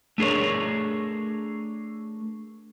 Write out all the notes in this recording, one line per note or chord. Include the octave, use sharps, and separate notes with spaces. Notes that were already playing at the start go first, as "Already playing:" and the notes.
A3 D4 G#4 A#4 C#5